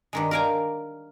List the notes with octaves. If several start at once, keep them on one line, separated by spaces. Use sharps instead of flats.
G2 D#3 G#3
A#4 D5 F5 G5 G#5 A#5